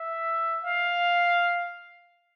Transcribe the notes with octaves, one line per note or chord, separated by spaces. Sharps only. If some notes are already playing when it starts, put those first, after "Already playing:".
Already playing: E5
F5